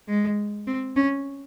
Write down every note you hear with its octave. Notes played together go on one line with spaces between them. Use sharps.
G#3
C4
C#4